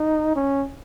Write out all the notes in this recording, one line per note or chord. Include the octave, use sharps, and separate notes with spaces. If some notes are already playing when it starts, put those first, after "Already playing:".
Already playing: D#4
C#4